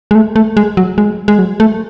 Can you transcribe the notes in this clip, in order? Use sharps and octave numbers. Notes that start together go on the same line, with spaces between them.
G#3
A3
A3
G#3
F#3
G#3
G#3
F#3
A3